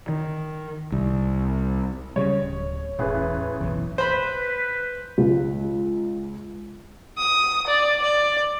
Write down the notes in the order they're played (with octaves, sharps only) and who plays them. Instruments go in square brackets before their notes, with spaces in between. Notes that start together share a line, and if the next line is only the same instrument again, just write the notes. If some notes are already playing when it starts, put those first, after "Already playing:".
[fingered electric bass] D#3
C2
[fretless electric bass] C#3 G3 [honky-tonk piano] C#5
[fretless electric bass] D1
[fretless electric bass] E1 [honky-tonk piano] A1 G#4 B4
[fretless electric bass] F#1 B1 E3
[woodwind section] B4 [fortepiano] C5 B5
[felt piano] C#2
[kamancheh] D#6
D5
D5